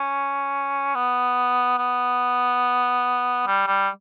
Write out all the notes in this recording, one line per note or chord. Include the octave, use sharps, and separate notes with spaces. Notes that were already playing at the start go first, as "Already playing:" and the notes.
Already playing: C#4
B3
B3
G3
G3